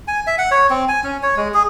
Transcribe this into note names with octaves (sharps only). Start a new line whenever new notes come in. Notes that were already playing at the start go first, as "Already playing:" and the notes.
G#5
E5
F#5
C#5
C4
G#5
C#4
C#5
G#3
G#4